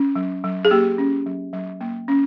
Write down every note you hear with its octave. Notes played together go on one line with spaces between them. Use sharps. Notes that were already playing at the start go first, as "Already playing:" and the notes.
Already playing: C#4
F#3
F#3
G#4
A#3 G4
C#4
F#3
F#3
A#3
C#4